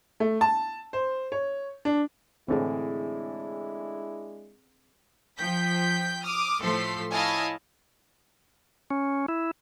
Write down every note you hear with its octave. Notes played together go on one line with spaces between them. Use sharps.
A3
A5
C5
C#5
D4
A2 D3 E3 G#3 C4 D4 E4 G#4
F3 G5 G6 B6
D6 D#6 F6
A2 F3 A3 A4 C6 B6
E4 C#5 D#5 F5 G#5 A5
C#4
E4